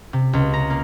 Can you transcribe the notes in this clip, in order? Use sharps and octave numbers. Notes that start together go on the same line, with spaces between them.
C3
C#2
A#5
A#3